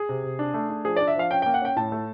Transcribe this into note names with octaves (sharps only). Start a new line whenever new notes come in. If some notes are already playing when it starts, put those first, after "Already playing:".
Already playing: G#4
C3
C3
D4
A3
D4
F3 G#4
D4 D5
E5
F3 F5
C#4 G5
A#3 G5
F#5
C#4 G5
A2 A5
A3